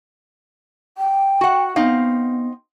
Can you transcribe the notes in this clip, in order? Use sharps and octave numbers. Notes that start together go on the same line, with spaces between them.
G5
F#4 F#5
B3 C4 D#4 F5